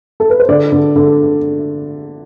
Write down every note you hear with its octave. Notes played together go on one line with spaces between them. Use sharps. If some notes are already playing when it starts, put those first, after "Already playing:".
A4
B4
C5
D3 D5
D3
D3